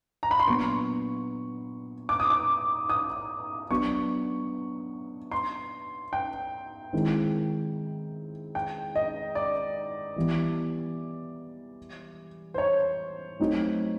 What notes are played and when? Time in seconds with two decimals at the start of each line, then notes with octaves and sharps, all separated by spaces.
0.23 A#5
0.31 B5
0.40 C6
0.47 A#2 F#3 B3 D4 C#6
2.09 D6
2.20 D#6
2.30 D6
2.89 D#6
3.70 F#3 B3 D4 C#6
5.31 C6
6.13 G5
6.93 D#3 G#3 C4 E4
8.55 G5
8.95 D#5
9.35 D5
10.16 E3 G3 B3
12.54 C5
12.58 C#5
13.39 F#3 A3 C4 D#4